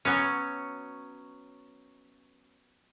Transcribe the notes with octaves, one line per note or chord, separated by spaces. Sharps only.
F#3 B3 C#4